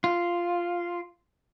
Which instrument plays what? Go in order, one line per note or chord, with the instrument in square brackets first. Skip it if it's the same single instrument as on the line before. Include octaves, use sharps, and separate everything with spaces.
[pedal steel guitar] F4